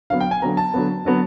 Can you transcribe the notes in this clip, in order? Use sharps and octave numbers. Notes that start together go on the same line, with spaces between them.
D3 F#3 B3 F5
G5
G#5
D3 F#3 B3 A#5
A5
D3 F#3 B3
D3 F#3 B3